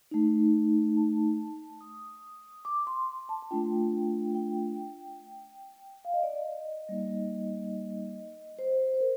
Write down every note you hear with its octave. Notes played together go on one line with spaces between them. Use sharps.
A3 D#4
A5
D#6
D6
C6
A5
A5
A3 D4 F4 G5
G5
F5
D#5
D5
D#5
G3 A#3 D#4
C5
C5
A#4